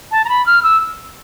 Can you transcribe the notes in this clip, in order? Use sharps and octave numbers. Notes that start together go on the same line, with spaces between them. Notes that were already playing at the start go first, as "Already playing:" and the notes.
A5
A#5
B5
F6
E6